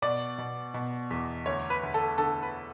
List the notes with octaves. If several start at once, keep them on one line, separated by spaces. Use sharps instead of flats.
B2 D5
B2
B2
E2
D2 C#5
B4
D2
A4
D3 A4
B4